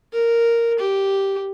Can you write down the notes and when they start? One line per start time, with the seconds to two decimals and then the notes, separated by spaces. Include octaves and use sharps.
0.13 A#4
0.79 G4